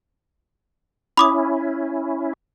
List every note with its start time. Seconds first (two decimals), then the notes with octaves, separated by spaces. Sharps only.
1.17 C#4 E4 B5 D6 D#6